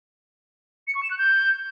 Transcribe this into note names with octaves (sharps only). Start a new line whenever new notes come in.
C#7
C#6
E7
F#6
G6